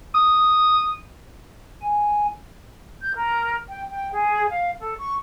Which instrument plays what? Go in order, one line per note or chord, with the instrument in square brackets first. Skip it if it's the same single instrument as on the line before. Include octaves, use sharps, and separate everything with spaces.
[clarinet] D#6
[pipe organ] G#5
[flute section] G6
A#4
G5
G5
G#4
F5
A4
C#6